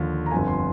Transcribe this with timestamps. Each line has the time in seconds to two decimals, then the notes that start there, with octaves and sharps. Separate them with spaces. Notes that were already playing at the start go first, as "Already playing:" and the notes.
Already playing: D#2 D3 F3
0.26 A#5
0.31 G1 F2 D3 G#5
0.48 C6